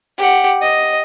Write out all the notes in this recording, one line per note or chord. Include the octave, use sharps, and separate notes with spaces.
G4 F#5
D#5